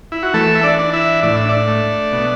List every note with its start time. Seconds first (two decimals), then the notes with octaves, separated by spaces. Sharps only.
0.12 E4
0.23 F#4
0.34 E3 A3 A4
0.55 E5
0.63 D4 D5
0.79 D4
0.93 E4 E5
1.23 A2 D5
1.36 E5
1.49 D4 D5
1.68 A3
2.13 B2